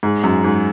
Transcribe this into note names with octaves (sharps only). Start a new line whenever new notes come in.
G#2
F#2
G#2